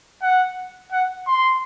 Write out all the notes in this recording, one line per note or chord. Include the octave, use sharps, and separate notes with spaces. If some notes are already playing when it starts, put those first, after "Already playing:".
F#5
F#5
C6